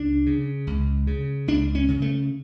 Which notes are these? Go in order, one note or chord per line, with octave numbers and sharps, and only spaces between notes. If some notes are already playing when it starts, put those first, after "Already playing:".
Already playing: C#2 D4
C#3
C#2
C#3
C#2 D4
C#4
C#3
A3